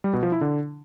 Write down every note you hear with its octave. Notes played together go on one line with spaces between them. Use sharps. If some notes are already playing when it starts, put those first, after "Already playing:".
G3
B2
F3
E4
D3